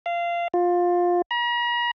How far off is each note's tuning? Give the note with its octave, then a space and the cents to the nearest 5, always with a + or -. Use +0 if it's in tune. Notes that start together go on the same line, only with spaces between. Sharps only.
F5 -20
F4 +15
A#5 +45